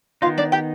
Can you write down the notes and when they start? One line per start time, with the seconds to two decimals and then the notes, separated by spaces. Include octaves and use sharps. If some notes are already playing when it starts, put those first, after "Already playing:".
0.22 D#3 B3 D#4 F4 F5
0.38 D4 D5
0.52 G4 G5